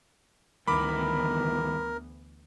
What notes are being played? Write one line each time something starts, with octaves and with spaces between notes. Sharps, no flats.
D2 G2 D#3 E3 B3 A#4 B5 D6